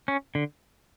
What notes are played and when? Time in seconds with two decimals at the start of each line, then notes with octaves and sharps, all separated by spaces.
0.08 C#4
0.35 D3